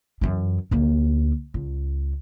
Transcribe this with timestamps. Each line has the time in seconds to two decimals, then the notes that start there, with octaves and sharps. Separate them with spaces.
0.21 F#2 E3
0.71 D2 A#3
1.54 C#2